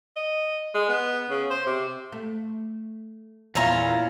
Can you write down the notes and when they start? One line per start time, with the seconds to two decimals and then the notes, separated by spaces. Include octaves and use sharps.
0.16 D#5
0.75 G#3
0.89 B3
1.30 C#3
1.50 C5
1.66 C3
2.12 A3
3.55 E2 A#2 B3 C#4 E4 F4 A#5